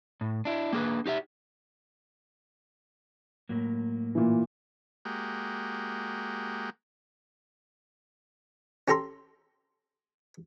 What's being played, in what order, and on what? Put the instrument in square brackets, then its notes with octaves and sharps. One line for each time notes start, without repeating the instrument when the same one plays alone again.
[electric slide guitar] A2
D4 E4
A#3 D4 G#4 A4 B4
D#4 G4 D5 E5
A2 F#3 A#3
[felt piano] A#2 E3
[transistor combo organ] G#3 A#3 F#4 G4
[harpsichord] C#4 G4 A4 A#5 C6